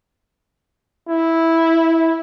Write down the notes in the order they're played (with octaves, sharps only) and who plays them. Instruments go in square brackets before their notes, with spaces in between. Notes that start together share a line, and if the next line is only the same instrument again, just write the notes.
[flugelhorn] E4